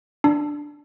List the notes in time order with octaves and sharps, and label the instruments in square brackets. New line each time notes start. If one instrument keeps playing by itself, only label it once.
[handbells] D4